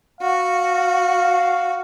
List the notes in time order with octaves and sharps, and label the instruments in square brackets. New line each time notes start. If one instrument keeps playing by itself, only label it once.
[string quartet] F#4 [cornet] F5